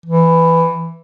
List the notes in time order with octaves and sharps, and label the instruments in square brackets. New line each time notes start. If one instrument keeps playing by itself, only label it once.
[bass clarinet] E3